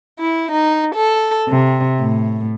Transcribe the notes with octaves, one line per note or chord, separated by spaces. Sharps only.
E4
D#4
A4
C3
A2